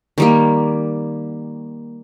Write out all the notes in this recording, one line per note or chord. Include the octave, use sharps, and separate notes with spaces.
D#3 G3 A#3